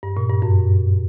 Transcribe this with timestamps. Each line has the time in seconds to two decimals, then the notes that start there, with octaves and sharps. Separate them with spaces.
0.03 G2
0.17 A#2
0.29 G2
0.42 F#2